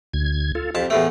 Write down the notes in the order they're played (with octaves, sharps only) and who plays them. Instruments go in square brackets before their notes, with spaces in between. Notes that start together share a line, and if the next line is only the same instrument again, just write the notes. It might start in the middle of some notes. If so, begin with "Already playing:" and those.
[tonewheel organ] D2 G#6
F4 A4
[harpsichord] F2 A5 [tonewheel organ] G4
[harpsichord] E2 A2 A3